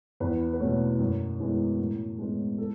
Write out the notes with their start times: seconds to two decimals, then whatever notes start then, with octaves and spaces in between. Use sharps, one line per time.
0.20 E2 B4
0.53 B4
0.60 B2 A3 C#5
0.99 F#2
1.40 E3 G#3 B3
1.79 A2
2.19 G#3 B3
2.58 A4